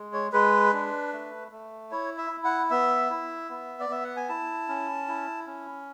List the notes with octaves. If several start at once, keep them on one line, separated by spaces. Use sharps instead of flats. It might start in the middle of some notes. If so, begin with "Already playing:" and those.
Already playing: G#3
C#5
G#3 B4
D4
A3
A3
E4 C#5
E5
E4
F#5
B3 E5
E4
B3
D5
B3 E5
F#5
G#5
E4 A5
C#4
E4
C#4